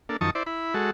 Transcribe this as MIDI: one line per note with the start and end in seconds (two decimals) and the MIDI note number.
0.09 0.17 58
0.09 0.17 62
0.09 0.17 69
0.21 0.30 42
0.21 0.30 51
0.21 0.30 53
0.21 0.30 81
0.21 0.30 85
0.21 0.30 87
0.35 0.43 64
0.35 0.43 72
0.35 0.43 74
0.46 0.74 64
0.46 0.74 83
0.74 0.91 56
0.74 0.91 66
0.74 0.91 69